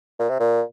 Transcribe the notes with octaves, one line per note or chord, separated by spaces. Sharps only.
A#2
C3
A#2